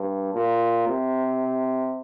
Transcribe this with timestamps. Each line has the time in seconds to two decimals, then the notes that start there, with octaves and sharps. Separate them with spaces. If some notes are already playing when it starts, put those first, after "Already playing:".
Already playing: G2
0.34 A#2
0.88 C3